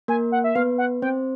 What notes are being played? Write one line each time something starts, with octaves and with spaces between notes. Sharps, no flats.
A#3 A#4 G#5
F#5
E5
B3 B4 F5
F#5
C4 C5 G5